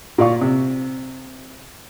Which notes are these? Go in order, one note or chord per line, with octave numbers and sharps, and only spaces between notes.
A#2 F4 D5 F5 C#6
C3